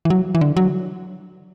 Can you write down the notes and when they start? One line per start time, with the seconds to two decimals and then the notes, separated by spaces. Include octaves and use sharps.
0.05 E3
0.10 F#3
0.35 E3
0.41 D3
0.57 F#3